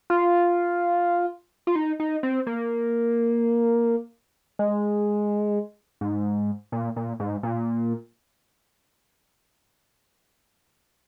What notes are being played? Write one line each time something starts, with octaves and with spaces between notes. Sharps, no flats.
F4
F4
D#4
D#4
C4
A#3
G#3
G#2
A#2
A#2
G#2
A#2